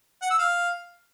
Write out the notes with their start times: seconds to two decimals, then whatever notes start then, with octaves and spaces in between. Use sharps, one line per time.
0.22 F#5
0.30 E6
0.39 F5